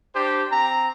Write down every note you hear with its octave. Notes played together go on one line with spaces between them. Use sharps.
D4 G4 C5
C4 A#5